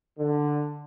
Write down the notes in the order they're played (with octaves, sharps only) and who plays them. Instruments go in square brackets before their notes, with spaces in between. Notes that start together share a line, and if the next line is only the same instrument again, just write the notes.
[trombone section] D3